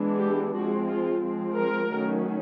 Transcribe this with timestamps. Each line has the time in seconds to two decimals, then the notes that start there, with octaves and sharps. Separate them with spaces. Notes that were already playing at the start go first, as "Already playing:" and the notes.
Already playing: E3 G#3 B3 D4
0.20 G4
0.54 F3 G#3 C4 F#4
0.88 F4
1.22 F3 G#3 C4
1.56 A#4
1.91 D#3 F#3 A3 C#4